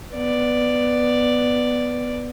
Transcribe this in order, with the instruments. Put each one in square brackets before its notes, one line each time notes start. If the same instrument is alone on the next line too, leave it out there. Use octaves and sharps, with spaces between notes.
[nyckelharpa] B3 D5